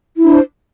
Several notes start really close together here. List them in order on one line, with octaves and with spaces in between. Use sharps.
E4 D4 C5